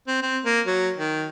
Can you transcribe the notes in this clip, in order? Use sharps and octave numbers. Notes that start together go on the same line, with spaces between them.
C4
C4
A#3
F#3
D#3